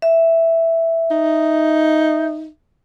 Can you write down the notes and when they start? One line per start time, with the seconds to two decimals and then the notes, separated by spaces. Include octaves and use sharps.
0.02 E5
1.11 D#4